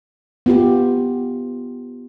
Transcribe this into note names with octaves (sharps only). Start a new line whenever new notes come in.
B3 F4 G4